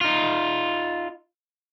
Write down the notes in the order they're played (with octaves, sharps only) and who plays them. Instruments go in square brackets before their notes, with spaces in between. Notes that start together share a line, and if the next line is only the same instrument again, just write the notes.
[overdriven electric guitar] D#4 F4